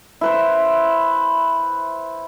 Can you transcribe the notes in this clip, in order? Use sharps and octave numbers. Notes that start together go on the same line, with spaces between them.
E4 B4 C5